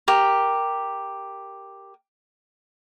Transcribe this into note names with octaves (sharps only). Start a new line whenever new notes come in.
G4 A#4